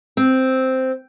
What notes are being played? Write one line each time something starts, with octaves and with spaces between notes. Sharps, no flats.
C4